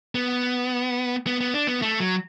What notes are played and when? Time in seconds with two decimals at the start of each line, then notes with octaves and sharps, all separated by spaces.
0.15 B3
1.27 B3
1.40 B3
1.54 D4
1.67 B3
1.82 A3
2.00 F#3